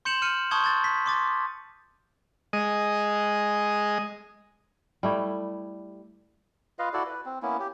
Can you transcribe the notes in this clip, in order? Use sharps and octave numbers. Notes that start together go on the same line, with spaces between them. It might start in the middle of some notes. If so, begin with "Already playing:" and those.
C6 G6 C#7 E7 F#7
F6 C#7 D#7
A5 C6 C#6 D#6 G6 G#6
G#6 A6
B6
C6 D6 A6
G#3 D#5
G3 A3 E4
F4 B4 D#5 F5
E4 F#4 A4 D5
B4
C4
A#3 B3 C#4 E4
G4